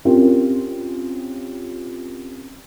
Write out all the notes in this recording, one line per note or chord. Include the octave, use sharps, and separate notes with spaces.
C4 C#4 F4 G4 A#4